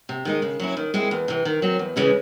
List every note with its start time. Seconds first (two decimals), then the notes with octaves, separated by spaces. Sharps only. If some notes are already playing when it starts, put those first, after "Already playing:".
0.09 C3
0.25 D#3 G#3 D#4
0.42 C#3
0.60 F#3 C#4 E4
0.77 D#3
0.94 G#3 C4 E4
1.11 E2
1.28 C3 E3
1.45 D#3
1.62 F#3 C4
1.79 E2
1.96 C#3 E3 G#3 C#4